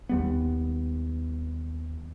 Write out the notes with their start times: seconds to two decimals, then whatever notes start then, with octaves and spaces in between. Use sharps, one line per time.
0.09 D#2 G3 B3